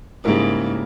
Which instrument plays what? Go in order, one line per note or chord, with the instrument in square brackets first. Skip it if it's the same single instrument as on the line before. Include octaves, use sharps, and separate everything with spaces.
[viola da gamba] G#2 [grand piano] C#3 G3 A#3 E4 A#4